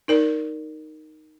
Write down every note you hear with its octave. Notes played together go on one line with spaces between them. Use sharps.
D#4 A#4 D5